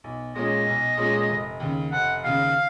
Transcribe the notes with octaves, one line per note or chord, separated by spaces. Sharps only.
B1
A#2 G#3 C#4 G#4 D#5
B1
A#2 G#3 C#4 G#4
F1
D#2 C#3
F1 F#5
D#2 C#3 F5